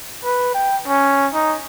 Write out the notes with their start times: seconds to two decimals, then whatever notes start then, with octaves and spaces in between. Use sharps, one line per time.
0.24 B4
0.54 G5
0.87 C#4
1.33 D#4